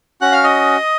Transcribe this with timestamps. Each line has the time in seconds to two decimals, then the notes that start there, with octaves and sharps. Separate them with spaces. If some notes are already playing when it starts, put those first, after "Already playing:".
0.21 C#4 F#4 F#5 F#6
0.32 F5 F6
0.44 D#5 D#6